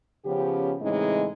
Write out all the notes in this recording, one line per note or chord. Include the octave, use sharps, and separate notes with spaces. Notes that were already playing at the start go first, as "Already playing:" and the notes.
C#3 F3 B3 C#4 G4
A2 C#3 E3 G#3 C4 D#4